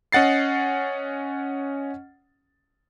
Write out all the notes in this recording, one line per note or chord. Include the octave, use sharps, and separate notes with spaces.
C#4 D#5 F#5 A6 C7